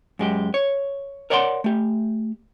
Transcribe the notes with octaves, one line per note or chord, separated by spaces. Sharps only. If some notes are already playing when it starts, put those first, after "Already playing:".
F#2 G#3 G4
C#5
A#4 C#5 D5 F#5 A5 C6
A3 G4